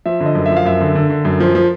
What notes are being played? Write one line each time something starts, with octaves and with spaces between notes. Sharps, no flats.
F3 E5
D3
D#5
F#2
F3 E5
F5
F#2 E5
D3
D3
D3
F#2
F3
F3